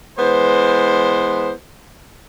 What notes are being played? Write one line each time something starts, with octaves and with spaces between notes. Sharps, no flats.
E3 G#3 B3 C5